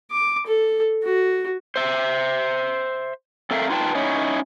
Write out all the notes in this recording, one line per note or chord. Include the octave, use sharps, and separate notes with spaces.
D6
A4
F#4
C5 E5
C4 A4 A#4 E5 F5
D#4 F4 B4 F#5 G5 A5
C#4 D#4 E4 C#5